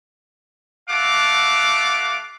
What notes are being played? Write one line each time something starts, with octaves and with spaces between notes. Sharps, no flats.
A3 F#4 A4 F5 F#5 D6